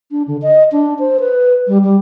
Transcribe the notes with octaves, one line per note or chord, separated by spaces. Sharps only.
D4
D3
D#5
D4
C5
B4
G3
G3